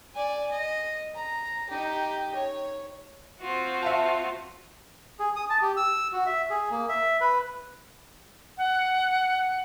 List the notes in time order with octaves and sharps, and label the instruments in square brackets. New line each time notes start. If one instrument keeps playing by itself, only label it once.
[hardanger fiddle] D5 G#5
D#5
A#5
D#4 G4
C#5
[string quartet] C4 F4 F#4
[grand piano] E5 F5 A5
[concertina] G#4
D#6
A5
G4
E6
F#4
E5
G#4
A#3
E5
B4
[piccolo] F#5